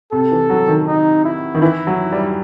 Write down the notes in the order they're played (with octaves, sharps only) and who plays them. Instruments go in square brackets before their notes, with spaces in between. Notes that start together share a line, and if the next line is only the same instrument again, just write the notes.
[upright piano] C3 [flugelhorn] A4
[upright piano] E3
F#3
D#3
[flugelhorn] D#4
E4
[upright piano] D#3
[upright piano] E3 [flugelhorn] E4
[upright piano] F#3
G3